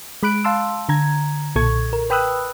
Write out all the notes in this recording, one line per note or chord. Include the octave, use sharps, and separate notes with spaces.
G#3 B5 F#6 D7
F5 A5 C6 E6
D3 A#5 G#6
B1 A#2 A4 C#6 G#6
A#4
B4 G5 B5 D#6 E6 F#6